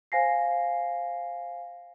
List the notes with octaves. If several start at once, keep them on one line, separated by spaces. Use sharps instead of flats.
C5 F5 G#5 A#6 C7